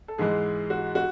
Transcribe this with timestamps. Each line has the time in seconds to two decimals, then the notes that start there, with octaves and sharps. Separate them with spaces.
0.08 A4
0.18 G#2 E3 G#3 G#4
0.70 F#4
0.95 F#4